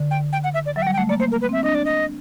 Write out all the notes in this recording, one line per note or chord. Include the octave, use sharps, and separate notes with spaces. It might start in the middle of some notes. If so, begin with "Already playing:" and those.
Already playing: D3
G5
G5
F#5
E5
D5
F#3 E5
G5
G3 F#5
G5
A3 F#5
A#3 D5
A#3 C5
A#4
B4
C4 E5
D4 D#5
D5
D#5